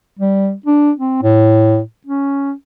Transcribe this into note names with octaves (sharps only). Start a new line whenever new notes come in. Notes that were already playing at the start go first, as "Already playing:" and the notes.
G3
D4
C4
A2
C#4